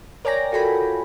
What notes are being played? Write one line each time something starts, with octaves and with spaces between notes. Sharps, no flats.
A#4 C#5 D5 G5 G#5 A#6
F4 F#4 A4 G5 G#5 B5